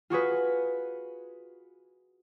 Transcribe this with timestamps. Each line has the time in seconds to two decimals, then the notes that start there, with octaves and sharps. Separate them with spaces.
0.10 F4 F#4 G#4 B4